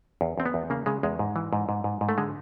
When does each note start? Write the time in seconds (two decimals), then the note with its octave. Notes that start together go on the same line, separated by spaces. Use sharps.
0.21 E2
0.38 E2 C4
0.46 B3
0.54 E2
0.70 C#3 A#3
0.86 C#3 G#3
1.03 E2 G#3
1.19 G#2
1.36 E3
1.53 G#2
1.69 G#2
1.84 G#2
2.01 G#2
2.09 A3
2.18 D3 G#3